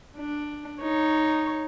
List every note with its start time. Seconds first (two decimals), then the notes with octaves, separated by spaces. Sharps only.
0.17 D4
0.81 D#4 C#5